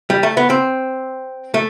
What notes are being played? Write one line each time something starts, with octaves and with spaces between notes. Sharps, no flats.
G3
A3
B3
C4
A3